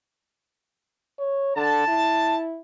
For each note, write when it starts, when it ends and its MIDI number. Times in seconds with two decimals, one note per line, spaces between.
1.19 1.55 73
1.56 1.85 50
1.56 2.37 81
1.88 2.61 64